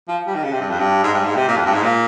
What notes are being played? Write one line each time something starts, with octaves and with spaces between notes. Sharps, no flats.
F3
G3
D#3
C#3
C3
G2
F2
G2
G#2
G2
G#2
C3
A#2
F2
G2
G#2
A#2